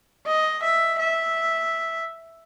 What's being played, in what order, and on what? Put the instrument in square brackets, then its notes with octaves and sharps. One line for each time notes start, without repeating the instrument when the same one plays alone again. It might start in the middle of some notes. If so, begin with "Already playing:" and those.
[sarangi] D#5
E5
E5